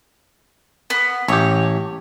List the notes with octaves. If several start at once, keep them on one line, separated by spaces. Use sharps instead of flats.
B3
A1 G4 C#5